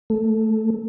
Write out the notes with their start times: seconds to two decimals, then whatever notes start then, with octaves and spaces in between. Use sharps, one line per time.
0.10 A3